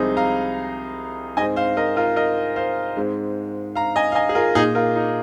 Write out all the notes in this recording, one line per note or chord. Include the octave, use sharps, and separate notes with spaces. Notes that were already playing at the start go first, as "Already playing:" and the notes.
Already playing: C2 C3 F3 G#3 D#4 G#4
F5 A#5
G#2 G#3 C4 D#5 G#5
C5 F5
A#4 D#5
F4 A#4
A#4 D#5
C5 F5
G#2 G#3 C4
F5 A#5
D#5 G#5
F5
D#5 G#5
G#4
F4 A#4
A#2 A#3 D#4 G#4
F4 A#4
D#4